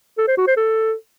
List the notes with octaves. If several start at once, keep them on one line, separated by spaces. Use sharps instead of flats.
A4
C5
F#4
C5
A4